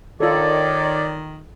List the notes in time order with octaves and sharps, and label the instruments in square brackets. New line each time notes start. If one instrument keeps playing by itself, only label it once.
[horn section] D#3 [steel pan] F4 A4 [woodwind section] C#5 D5